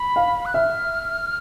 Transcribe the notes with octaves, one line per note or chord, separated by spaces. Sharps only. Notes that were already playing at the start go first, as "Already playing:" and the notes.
Already playing: B5
F5
F#6
E5 F6